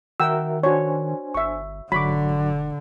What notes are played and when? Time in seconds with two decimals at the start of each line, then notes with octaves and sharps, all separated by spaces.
0.20 D#3 F#4 A#4 E5 F#5 G5 E6
0.63 D4 F#4 C5 C#5 G#5
1.34 G1 E5 C#6
1.92 E1 G#2 D3 F#3 B5 C#6 D6